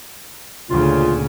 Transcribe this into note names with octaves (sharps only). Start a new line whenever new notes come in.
D2 A#2 C#3 F4